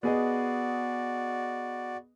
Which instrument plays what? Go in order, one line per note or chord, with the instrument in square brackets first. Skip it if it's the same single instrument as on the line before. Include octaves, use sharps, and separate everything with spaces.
[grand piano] B3 G#4 D#5 [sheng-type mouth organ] F#4 D5